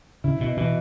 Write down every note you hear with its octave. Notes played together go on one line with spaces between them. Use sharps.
C#3 E4
B2
B2 E3